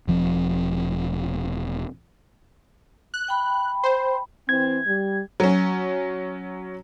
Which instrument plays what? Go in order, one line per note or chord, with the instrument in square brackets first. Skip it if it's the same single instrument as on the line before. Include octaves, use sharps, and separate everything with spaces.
[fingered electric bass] E1 F3 C4
[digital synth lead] F#6
[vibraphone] G5 B5
[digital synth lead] C5
[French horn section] E3 C4 [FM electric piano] G#6
[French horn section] G3
[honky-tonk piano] F#3 C#4